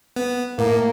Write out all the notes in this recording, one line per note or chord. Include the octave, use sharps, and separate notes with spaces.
B3
A2 A#3